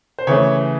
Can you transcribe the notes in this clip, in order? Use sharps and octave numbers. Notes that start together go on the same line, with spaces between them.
C5
C#3 E3 A3 C#5